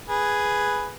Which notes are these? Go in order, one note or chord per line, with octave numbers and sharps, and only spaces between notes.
G#4 B4